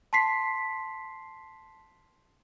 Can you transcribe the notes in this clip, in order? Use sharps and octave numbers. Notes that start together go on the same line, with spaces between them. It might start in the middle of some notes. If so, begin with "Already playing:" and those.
A5 C6 B6 C7